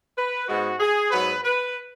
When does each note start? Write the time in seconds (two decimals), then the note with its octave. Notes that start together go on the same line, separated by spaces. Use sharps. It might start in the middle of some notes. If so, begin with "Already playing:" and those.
0.17 B4
0.48 G#2 G#3 B3 F#4
0.79 G#4
1.11 G#2 F#3 B3 B4
1.43 B4